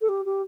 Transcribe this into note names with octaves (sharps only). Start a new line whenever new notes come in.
A4
G4
G4